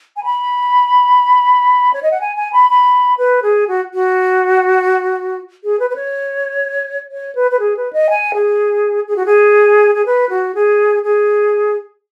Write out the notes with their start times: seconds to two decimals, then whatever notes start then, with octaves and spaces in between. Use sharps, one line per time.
0.17 G#5
0.24 B5
1.93 C#5
2.03 D#5
2.11 F#5
2.21 G#5
2.36 G#5
2.53 B5
2.70 B5
3.18 B4
3.43 G#4
3.68 F#4
3.94 F#4
5.64 G#4
5.80 B4
5.90 B4
5.96 C#5
7.11 C#5
7.35 B4
7.51 B4
7.59 G#4
7.77 B4
7.93 D#5
8.10 G#5
8.34 G#4
9.08 G#4
9.16 F#4
9.26 G#4
9.95 G#4
10.06 B4
10.30 F#4
10.55 G#4
11.04 G#4